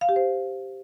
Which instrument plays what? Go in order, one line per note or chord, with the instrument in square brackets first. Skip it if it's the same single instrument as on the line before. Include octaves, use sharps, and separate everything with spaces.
[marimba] F5
G4
C5